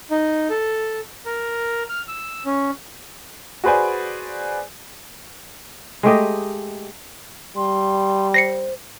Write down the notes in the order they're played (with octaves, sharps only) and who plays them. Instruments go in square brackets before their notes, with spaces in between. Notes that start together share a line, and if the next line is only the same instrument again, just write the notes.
[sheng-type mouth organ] D#4
A4
A#4
F6
E6
C#4
[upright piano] F#4 G#4 B4 C5 D5 G#5
[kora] G#3 A3 G4 D#5
[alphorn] G3 [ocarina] C6
[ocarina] C5 [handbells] A#6 C7 C#7